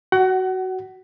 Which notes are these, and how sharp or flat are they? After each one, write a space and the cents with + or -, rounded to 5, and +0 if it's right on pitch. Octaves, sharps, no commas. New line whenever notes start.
F#4 +10 F#5 +30